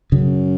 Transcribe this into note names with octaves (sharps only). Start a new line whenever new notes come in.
F#2 C#3